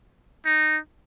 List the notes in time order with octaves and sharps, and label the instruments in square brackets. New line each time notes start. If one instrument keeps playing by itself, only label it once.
[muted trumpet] D#4